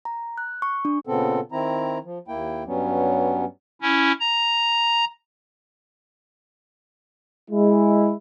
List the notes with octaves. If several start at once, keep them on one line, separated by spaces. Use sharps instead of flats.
A#5
F#6
C#6
D4
A#2 C#3 B3 C4 A4
D#3 C4 E4 A#5
F3
D#2 A#3 E4 G5
G2 F#3 G3 B3 C#4
C#4 E4
A#5
G#3 E4